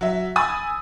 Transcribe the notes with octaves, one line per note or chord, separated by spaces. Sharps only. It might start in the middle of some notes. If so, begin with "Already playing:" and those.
F#3 E5
G#5 B5 D#6 E6 A6